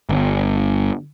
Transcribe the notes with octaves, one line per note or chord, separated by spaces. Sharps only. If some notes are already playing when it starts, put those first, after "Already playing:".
G1